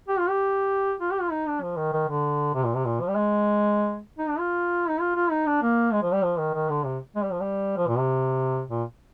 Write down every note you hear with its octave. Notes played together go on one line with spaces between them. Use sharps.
G4
F4
G4
F4
G4
F4
D#4
D4
F3
D#3
D#3
D3
C3
A#2
C3
A#2
F3
G3
G#3
D#4
D4
F4
D#4
F4
F4
D#4
D4
A#3
G#3
F3
G3
F3
D#3
D#3
D3
C3
G#3
G3
F3
G3
F3
A#2
C3
A#2